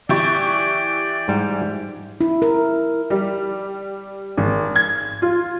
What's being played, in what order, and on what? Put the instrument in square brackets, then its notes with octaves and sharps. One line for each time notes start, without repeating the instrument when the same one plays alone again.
[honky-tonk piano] E3 G4 C#6 [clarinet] D5
[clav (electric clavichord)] G#2 G3
[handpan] E4
A#4
[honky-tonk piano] G3
G#1
G#6
F4